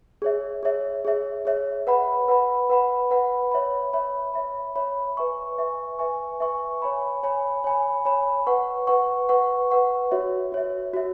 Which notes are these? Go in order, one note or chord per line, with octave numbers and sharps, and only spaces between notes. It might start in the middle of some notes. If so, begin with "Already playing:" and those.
G#4 C#5 E5
G#4 C#5 E5
G#4 C#5 E5
G#4 C#5 E5
B4 F#5 B5
B4 F#5 B5
B4 F#5 B5
B4 F#5 B5
C#5 E5 B5
C#5 E5 B5
C#5 E5 B5
C#5 E5 B5
B4 E5 G#5 C#6
B4 E5 G#5 C#6
B4 E5 G#5 C#6
B4 E5 G#5 C#6
C#5 G#5 B5
C#5 G#5 B5
C#5 G#5 B5
C#5 G#5 B5
B4 F#5 C#6
B4 F#5 C#6
B4 F#5 C#6
B4 F#5 C#6
F#4 C#5 E5
F#4 C#5 E5
F#4 C#5 E5